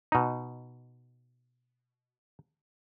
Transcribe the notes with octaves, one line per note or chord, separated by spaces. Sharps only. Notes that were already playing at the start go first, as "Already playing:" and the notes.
B2 D#4